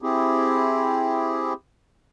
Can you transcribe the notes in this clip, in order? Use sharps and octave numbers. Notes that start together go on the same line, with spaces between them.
C4 E4 G4 G#4